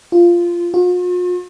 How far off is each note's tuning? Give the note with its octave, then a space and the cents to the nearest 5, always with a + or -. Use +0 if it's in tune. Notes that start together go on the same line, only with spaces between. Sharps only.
F4 -10
F4 +45